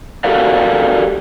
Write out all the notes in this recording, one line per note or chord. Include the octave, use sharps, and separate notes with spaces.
F#4 G4 A4 A#4 D5 F5